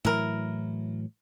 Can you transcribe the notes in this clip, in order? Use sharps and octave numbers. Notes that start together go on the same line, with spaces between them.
A2 E3 F#3 E4 A#4